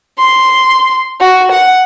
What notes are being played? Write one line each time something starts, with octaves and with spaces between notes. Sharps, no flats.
C6
F#4
F#5